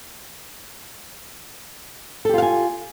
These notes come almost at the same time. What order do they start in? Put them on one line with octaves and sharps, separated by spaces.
A4 G4 F4 F5 G#5